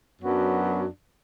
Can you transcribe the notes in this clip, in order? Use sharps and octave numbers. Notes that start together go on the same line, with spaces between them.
F#2 F#3 B3 D4 F#4